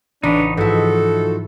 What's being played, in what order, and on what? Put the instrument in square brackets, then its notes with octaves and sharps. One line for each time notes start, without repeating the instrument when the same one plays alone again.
[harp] A1 [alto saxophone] D4 [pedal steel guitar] D#4 B4 C#5
[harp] G#2 E4 [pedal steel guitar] F3 D#4 F#4 [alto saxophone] A4